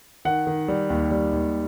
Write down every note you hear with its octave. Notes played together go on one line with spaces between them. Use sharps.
D#3 F#5
D#3
G3
D#2
G3
D#2